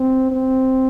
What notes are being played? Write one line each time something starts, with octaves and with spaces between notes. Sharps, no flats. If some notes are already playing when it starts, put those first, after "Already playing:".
Already playing: C4
C4